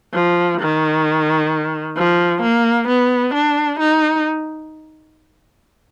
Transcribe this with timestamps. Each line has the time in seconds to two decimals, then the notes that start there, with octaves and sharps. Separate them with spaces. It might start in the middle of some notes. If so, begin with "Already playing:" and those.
0.13 F3
0.60 D#3
1.97 F3
2.42 A#3
2.88 B3
3.34 D4
3.80 D#4